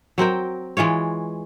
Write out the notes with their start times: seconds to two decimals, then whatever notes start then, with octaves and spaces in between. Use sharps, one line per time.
0.18 F#3 C4 A#4 G5
0.77 E3 G#3 F4 C#5